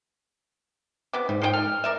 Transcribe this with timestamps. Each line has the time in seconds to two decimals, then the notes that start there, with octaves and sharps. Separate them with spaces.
1.13 C3 B3 D6
1.29 G#2 G3
1.42 F3 A4 G5
1.54 A4 F6
1.84 A#4 D5 E5